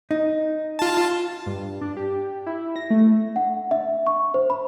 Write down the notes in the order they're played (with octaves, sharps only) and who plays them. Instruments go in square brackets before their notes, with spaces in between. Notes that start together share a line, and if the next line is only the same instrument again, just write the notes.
[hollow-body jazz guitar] D#4
[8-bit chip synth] F4 A5
[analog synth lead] G2
D4
G4
E4
A#6
A3
[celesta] F#5
E5
C#6
C5
B5